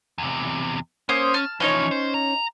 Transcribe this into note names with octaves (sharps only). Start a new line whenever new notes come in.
E2 C3
A#3 C#4 C5 D#6
A5 F6
E3 F3 C#4 D#4 C#5
C5
A#5